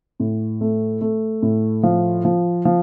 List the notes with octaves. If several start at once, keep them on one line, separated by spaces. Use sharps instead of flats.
A2
A3
A3
A2
F3
F3
F3